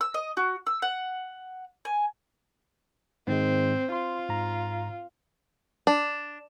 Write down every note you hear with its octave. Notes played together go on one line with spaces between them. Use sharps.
E6
D#5
F#4
E6
F#5
G#5
G#2 D#3 G#3 C4
F4 C6
G#2 A#5
D4